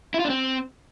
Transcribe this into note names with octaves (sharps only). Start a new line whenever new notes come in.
E4
F4
D4
C4